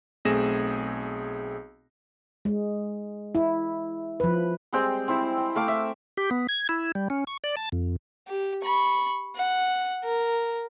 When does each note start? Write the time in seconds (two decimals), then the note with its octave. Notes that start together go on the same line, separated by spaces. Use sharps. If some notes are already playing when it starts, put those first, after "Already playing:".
0.25 B1 A3 C4 G#4 A#6 E7
2.45 G#3
3.35 E4
4.20 F3 B4
4.72 G3 G#3 C4 G5
5.08 C4 E4
5.37 G5
5.55 A3 F5 D6
5.68 E5
6.17 G4
6.31 B3
6.49 G#6
6.69 E4
6.95 G3
7.10 C#4
7.27 C#6
7.44 D5
7.57 A5
7.72 F2
8.28 G4
8.63 B5 C#6
9.35 F#5
10.04 A#4